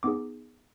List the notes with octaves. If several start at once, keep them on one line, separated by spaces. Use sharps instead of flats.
B3 D#4 G#4 D6